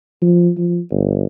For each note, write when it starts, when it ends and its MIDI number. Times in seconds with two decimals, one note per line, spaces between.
0.22 0.51 53
0.58 0.80 53
0.91 1.24 31